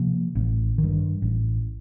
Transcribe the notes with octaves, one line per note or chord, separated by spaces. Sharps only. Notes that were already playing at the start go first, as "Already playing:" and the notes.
Already playing: C3 F3 A#3
A1
D#3
G2
A1